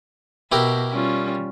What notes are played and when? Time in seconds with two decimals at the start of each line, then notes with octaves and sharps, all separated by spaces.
0.52 B2 E4 G4 A#4
0.92 G3 C#4 F4